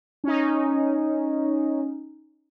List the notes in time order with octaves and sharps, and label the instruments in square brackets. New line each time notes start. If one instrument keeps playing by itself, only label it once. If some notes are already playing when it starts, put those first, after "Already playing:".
[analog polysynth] C#4 D#4